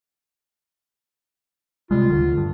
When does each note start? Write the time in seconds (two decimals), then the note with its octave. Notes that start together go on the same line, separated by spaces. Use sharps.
1.91 C3 G3 G#3 F4
2.10 D2 D3 D#3
2.37 G2